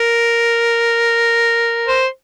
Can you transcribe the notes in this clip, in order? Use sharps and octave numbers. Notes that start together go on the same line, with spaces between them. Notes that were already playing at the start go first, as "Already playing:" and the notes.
Already playing: A#4
C5